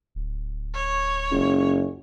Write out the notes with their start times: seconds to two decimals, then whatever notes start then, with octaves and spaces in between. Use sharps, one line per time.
0.15 D1
0.75 C#5
1.31 F#1 C#2